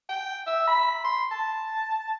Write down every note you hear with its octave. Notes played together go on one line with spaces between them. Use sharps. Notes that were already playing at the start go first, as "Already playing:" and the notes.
G5
E5
B5
C6
A5